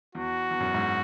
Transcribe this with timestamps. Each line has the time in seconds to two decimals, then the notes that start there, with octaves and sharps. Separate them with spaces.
0.15 E2 F#4
0.51 E2
0.60 F#2
0.74 G#2